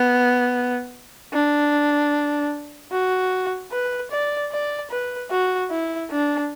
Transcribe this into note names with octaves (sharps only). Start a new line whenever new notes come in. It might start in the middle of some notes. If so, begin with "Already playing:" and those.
Already playing: B3
D4
F#4
B4
D5
D5
B4
F#4
E4
D4